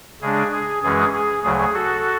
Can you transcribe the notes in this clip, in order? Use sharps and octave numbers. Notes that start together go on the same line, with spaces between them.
C#3 G#3 D4 G#4
G#4
F#2 E3 G#3 C#4 G#4
G#4
D2 C#3 F#3 G#4
F#4 A4